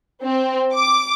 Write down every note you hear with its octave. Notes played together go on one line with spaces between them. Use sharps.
C4
D6